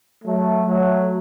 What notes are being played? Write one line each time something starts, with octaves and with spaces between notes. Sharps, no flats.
F#3 A3
F#3 A3